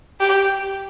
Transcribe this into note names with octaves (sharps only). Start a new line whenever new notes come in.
G4